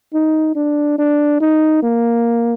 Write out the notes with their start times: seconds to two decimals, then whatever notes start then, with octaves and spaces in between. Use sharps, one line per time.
0.14 D#4
0.56 D4
0.98 D4
1.40 D#4
1.83 A#3